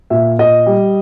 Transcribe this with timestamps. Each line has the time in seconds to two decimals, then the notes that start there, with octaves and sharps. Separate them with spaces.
0.10 A#2 E5
0.38 A#2 D#5
0.66 G3